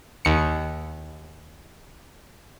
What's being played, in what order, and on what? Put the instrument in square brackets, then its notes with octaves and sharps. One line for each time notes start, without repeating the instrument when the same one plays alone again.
[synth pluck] D#2 C#7